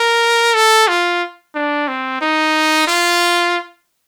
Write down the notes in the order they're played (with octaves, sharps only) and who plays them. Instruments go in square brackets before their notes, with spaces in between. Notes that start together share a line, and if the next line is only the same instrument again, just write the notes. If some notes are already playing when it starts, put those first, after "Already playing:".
Already playing: [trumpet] A#4
A4
F4
D4
C4
D#4
F4